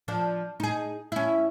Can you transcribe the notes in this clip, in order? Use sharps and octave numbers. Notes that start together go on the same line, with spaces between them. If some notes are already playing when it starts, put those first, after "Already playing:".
F3 D4
D#4 G#4
C#4 E4